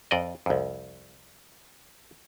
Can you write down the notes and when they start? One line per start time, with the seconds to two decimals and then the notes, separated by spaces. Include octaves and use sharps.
0.11 F2 D5 D#5
0.46 C2 F2